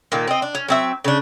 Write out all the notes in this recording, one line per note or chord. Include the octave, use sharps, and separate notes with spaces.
A#2 D#3 A#3
C4 D#5
D4
C#4
F#3 C4 E5
C#3 D4